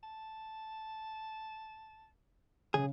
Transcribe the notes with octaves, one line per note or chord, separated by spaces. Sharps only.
A5
B1 C#3 G#4